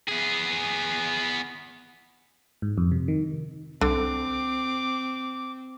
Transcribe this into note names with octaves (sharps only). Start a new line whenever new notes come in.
B3 G#4
G#2
F2
C3
D#3
C2 D3 C4 D6